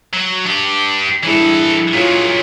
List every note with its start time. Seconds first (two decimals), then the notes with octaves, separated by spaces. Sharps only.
0.13 F#3
0.46 D4 G4
1.23 G2 E3 E4 G#4 A4
1.93 A#2 F#3 F4 G#4 C#5